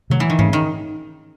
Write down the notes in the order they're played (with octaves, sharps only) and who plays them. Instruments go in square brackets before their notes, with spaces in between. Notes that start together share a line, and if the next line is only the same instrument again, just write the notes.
[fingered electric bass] C3 D#3 A3 [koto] F#3
[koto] E3
D#3
[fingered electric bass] G#2 E3 A3 C4 [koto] C#3
[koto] D#3